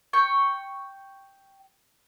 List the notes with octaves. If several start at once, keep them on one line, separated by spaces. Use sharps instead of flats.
G5 C#6